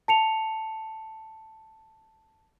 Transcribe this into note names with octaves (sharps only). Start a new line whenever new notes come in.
A5 C#7 F7